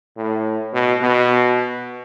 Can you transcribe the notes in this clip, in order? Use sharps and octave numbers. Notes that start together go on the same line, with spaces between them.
A2
B2
B2